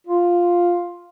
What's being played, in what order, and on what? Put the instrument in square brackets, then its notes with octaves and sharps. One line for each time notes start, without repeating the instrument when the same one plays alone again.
[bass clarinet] F4